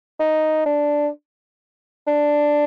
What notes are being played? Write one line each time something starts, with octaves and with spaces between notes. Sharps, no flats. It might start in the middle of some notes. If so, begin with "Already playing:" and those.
D#4
D4
D4